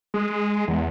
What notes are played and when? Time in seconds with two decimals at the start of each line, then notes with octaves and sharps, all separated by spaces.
0.14 G#3
0.68 E2